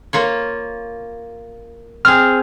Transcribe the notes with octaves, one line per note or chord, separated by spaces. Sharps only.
A#3 F4 C#5
C4 G#4 F6